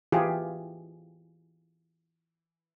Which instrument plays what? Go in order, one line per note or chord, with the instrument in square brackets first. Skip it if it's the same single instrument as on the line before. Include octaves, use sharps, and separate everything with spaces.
[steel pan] E3 F4 G4 G#4